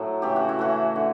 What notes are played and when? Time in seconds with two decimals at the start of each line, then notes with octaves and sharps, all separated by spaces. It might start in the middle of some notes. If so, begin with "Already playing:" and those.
Already playing: A2 F#3 A4
0.22 C#3 E3 A3 G4
0.36 F#4
0.49 E4
0.59 C#3 E3 A3 F#4
0.96 D3